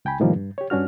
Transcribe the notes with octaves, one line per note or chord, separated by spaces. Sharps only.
C#2 G5 G#5 B5
A2 C3 D#3 F3 G3 A#3
G2
G4 C#5
G2 C#4 D4 F#4 F6